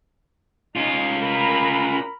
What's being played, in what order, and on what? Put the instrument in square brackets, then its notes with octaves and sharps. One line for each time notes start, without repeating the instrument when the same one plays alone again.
[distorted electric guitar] C#4 F4 [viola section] D#4
[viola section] A#4 A#5 B5